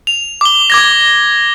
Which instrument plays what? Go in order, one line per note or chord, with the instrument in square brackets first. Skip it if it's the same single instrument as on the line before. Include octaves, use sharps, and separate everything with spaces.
[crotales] F7
D6 G7
D6 G#6 A#6